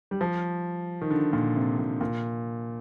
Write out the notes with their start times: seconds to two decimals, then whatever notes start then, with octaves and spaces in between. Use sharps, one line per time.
0.11 G3
0.21 F3
1.02 D#3
1.11 D3
1.33 A#2
1.56 C3
1.79 A#2
2.01 A#2